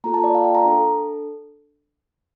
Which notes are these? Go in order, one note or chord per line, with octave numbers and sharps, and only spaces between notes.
A#3 F4 A4 A#5
A5
D5
F5
G5
A#5
D4 A4